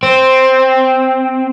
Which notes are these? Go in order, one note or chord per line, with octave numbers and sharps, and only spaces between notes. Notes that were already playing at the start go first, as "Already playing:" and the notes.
C4